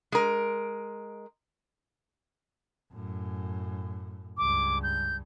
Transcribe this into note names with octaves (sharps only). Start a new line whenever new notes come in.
G#3 A#4
F#2 A2
C#2 G2 D6
G6